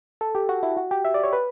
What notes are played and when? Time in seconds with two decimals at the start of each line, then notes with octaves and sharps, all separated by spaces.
0.21 A4
0.35 G4
0.49 F#4
0.63 E4
0.77 F#4
0.91 G4
1.05 E5
1.14 D5
1.23 C#5
1.33 B4